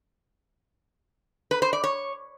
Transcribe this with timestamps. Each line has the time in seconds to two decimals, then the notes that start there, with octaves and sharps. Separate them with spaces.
1.51 B4
1.62 C5
1.73 D5
1.84 C#5